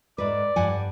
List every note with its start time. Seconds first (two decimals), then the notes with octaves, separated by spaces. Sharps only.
0.18 G#2 B4 D5
0.56 G2 F#5 G#5